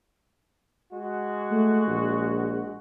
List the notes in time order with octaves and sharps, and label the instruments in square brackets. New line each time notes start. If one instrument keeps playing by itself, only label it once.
[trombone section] G#3 F#4
[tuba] A3
A#1